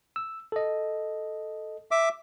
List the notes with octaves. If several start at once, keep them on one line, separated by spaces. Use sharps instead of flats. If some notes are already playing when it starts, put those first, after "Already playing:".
E6
A4 D#5
E5 D6